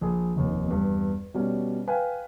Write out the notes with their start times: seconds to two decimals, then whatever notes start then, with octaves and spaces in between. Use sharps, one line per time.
0.01 A#1 G#4
0.36 F1 D#2
0.68 E2 G2
1.34 B2 G3 C#4
1.88 B4 F5 G5 G#5